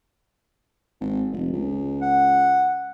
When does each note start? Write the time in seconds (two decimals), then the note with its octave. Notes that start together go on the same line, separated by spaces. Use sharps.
1.01 G#1
1.32 F1
1.52 C#2
2.02 F#5